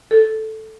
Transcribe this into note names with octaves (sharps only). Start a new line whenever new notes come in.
A4